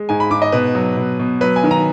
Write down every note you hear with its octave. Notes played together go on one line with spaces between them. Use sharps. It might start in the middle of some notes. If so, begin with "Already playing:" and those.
Already playing: G#3
G#2 G#5
B5
G#2 D6
D#5
B2 B4
F#3
B2
B2
F#3 B4
G#5
D#3
A#5